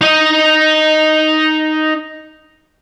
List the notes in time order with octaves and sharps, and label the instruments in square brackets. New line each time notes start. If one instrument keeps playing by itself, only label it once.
[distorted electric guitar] D#4 D#5